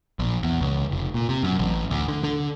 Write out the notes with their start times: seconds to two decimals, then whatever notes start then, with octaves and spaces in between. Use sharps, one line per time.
0.19 A#1
0.43 E2
0.61 C#2
0.91 F1
1.14 A#2
1.29 C3
1.43 F#2
1.59 A1
1.91 D2
2.08 D3
2.23 D3